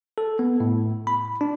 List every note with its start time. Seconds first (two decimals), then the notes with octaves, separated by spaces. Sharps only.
0.18 A4
0.39 B3
0.60 A2
1.07 B5
1.41 D4